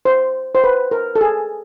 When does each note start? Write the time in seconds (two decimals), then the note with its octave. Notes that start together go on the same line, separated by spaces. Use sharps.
0.05 C5
0.55 C5
0.64 B4
0.91 A#4
1.16 A4
1.21 G#4